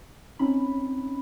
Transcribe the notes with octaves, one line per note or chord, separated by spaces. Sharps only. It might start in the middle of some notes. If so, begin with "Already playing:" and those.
C4 C#4 D#4 B5